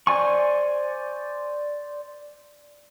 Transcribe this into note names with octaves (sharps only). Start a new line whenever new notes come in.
C5 D5 G#5 C#6